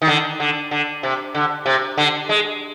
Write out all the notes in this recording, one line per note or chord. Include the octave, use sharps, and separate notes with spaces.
D#3
D3
D3
D3
C3
D3
C3
D3
G#3